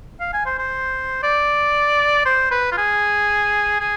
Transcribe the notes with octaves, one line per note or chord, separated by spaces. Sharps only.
F5
G#5
C5
C5
D5
C5
B4
F4
G#4
G#4